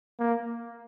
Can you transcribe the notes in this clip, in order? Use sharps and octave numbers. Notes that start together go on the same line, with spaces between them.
A#3